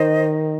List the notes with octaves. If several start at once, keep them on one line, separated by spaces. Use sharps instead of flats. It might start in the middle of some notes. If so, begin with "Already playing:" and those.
Already playing: D#3 C5 D#5